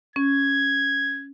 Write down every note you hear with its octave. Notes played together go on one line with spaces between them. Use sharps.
C#4 G#6